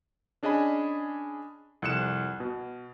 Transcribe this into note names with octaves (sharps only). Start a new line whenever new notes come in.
C#4 D4 G#4 D#5 G#5 B5
C2 F2 F#6 C#7 E7
B2